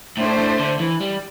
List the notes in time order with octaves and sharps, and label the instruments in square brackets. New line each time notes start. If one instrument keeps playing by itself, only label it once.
[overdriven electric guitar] A2 [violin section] A3 D4 C5
[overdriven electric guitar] A2
D3
E3
G3